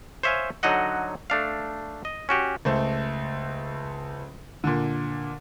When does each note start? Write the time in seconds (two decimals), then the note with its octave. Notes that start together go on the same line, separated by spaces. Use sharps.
0.23 C5 C#5 E5 F5 G#5
0.63 D3 F#3 D#4 F#4 D#5 F#5
1.30 A3 D4 F5
2.05 D#5
2.29 C#4 F#4 G4
2.65 C#2 A3 C5
4.64 A#2 D3